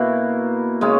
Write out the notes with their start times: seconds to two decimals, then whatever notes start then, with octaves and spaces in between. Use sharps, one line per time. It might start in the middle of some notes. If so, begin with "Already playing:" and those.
Already playing: B2 A#3 E4
0.81 C#3 G#3 C#4